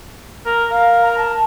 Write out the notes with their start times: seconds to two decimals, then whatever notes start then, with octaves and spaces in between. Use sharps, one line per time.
0.46 A#4
0.70 A#4 F5
1.02 A#5
1.17 A5